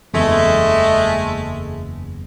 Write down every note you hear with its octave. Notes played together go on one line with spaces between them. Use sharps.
F#1 E2 G#3 A3